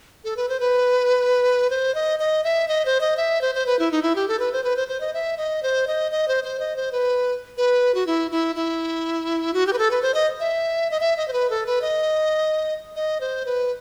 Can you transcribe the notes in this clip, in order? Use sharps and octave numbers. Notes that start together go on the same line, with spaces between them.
A4
B4
C5
B4
C5
D#5
D#5
E5
D#5
C5
D#5
E5
C5
C5
B4
E4
D#4
E4
G4
A4
B4
C5
B4
C5
C5
D#5
E5
D#5
C5
D#5
D#5
C5
C5
D#5
C5
B4
B4
F#4
E4
E4
E4
F#4
G4
B4
A4
B4
C5
D#5
E5
D#5
E5
D#5
C5
B4
A4
B4
D#5
D#5
C5
B4